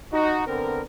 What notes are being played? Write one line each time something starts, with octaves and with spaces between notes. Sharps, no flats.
D#4 F#4
D3 B3 C4 A#4